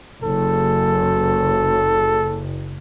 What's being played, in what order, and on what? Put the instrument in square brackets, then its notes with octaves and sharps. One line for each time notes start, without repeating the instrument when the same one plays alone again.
[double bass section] F#1 [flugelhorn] A4